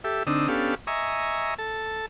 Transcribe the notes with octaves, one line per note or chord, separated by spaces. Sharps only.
G4 A4 E5
D3 C4 D4 D#4 D#6 E6
B3 C#4 D4 G4 A4 F5
D#5 E5 G#5 A#5 C#6
A4 A5